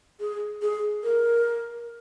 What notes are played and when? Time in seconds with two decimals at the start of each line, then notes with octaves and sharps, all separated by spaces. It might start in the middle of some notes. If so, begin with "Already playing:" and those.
0.20 G#4
0.62 G#4
1.03 A#4